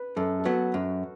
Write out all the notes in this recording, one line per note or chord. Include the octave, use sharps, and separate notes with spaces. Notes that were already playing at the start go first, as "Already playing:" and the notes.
Already playing: B4
F#2 A4
A4
F#3 B3 F#4
F#2